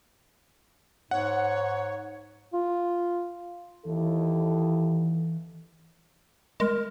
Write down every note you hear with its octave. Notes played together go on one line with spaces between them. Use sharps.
G#2 C#5 F#5
F4
D#2 E3 E4 A4
G#3 A#4